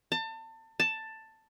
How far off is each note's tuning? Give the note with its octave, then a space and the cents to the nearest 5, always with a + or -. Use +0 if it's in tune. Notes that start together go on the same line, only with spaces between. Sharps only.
A5 +30
A5 +10